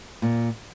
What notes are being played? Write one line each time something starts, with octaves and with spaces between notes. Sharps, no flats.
A#2